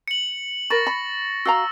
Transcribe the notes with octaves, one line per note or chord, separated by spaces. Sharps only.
C#7 F#7
A#4 B5 C#6 A6 A#6
B5
F#4 F5 A#5 E6